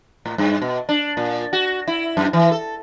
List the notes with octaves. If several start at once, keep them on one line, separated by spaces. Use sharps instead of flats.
A2
G2
B2
D4
A#2
F#4
E4
F#2
E3
A4